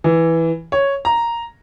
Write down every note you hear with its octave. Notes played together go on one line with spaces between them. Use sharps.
E3
C#5
A#5